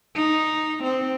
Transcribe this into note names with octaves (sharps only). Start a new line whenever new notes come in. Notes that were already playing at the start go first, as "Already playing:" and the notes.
D#4
C4